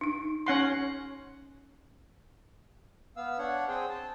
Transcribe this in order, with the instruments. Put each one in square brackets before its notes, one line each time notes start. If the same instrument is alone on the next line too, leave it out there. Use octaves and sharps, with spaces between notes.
[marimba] D4 D#4
[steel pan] C#4 F#5 C6
[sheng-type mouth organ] B3 F5 E6
D4 C#5 F#5
C4 G#4 C5 G5
A5